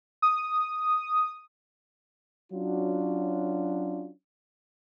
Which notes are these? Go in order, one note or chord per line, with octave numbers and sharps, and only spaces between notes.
D#6
F#3 C#4 D4 F4 F#4